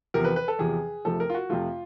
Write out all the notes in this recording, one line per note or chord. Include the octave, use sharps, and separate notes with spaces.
E2 C3 F3 A#4
B4
B4
A4
E2 C3 F3 G#4
F2 C3 F3 A3 A4
A#4
F4
F#4
F2 C3 F3 A3 F4